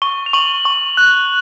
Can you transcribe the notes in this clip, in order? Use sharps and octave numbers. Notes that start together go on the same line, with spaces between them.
C#6 G7
F7
C#6 F#7
C#6
F#6